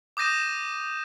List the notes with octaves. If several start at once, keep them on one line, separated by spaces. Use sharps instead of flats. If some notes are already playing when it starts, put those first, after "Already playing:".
D6 D#6 G6 A#6 D#7 E7